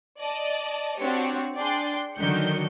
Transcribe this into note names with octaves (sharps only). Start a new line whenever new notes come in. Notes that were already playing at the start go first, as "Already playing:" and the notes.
D5 D#5 A5
C4 D4 F#4 G4 C#5
D4 G#4 D5 G5 C6
D3 D#3 F#3 F#4 G6 C#7